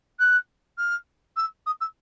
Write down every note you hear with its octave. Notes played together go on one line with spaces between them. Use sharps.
F#6
F6
E6
D#6
E6